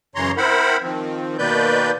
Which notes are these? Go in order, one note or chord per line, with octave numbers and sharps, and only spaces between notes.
F#2 C#3 E3 C#5 A#5 C6
C4 E4 A#4 C5 F#5 B5
D#3 F3 C4
B2 D#3 A#3 B4 D5 G6